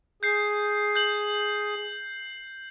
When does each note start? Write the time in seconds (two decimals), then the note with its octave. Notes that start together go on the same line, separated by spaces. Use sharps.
0.23 G#4 G6 C7
0.95 G6 F#7